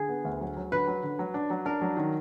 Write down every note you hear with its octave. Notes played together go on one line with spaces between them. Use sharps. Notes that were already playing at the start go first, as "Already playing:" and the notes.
Already playing: D3 G#4
B3
D2
F#3
F#3
D3 B4
F#3
D3
F#3
D4
F#3
D4 A#4
F#3
D#3